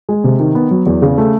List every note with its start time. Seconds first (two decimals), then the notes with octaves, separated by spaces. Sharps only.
0.09 G#3
0.24 C3
0.39 D#3
0.55 B3
0.71 F#3
0.86 E2
1.02 C#3
1.18 A3